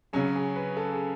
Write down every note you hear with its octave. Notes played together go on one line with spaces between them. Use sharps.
C#3 F#3 C#4 G#4
G#4
B4
A4
G#4